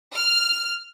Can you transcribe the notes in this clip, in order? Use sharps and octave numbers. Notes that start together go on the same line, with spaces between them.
F6